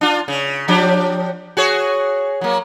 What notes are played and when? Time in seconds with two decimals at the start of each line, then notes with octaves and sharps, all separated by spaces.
0.01 D4 F4
0.28 C#3
0.68 F3 D4 G4
1.57 F#4 G#4 C#5
2.41 F#3 A#3